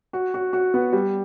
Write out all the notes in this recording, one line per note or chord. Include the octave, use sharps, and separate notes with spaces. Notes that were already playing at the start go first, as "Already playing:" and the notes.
F#4
F#4
F#4
B3
G3